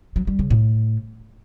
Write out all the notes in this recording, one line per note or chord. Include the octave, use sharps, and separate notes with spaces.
F#3
G3
C#3
A2